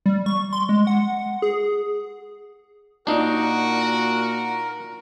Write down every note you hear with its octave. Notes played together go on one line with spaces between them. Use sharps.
G3
C#6
C6
G#3
F#5
G#4
A#2 D4 D#4 F#4 A#4